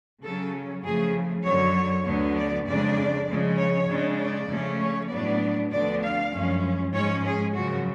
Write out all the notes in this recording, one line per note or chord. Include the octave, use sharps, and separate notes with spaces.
C#3 F#3 C#4 A4
F2 C#3 F3 A3 G#4
F#2 D3 F#3 C#5
D2 D3 F#3 B3
D5
F2 C#3 G#3 D4 D5
C#3 F3 G#3
C#5
C#3 G#3 D4
D5
C#3 F3 A3 C#4
C#5
A2 F#3 B3 D4 D5
D2 D3 F3 B3 D4 D5
F5
F#2 F3 G#3 C#4
G#2 F3 G#3 C#4 C#5
G#4
F#2 C#3 F3 F#4